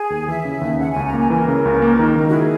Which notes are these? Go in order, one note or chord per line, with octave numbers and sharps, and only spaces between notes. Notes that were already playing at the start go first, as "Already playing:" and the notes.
Already playing: G#4
D#2
E3 E5
C#3
D#2
C#3 F#5
C#2 G#5
A#5
A#3 G#5
E3 A#4
C#3
C#2
A#3
D#3
D#3
F#4
E4 G#4